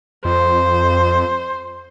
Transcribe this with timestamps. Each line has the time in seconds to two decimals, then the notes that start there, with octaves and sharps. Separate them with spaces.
0.25 F2 C5